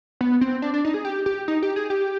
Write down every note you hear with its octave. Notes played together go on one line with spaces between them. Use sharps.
B3
C4
D4
D4
D#4
G#4
G4
G4
D#4
G4
G#4
G4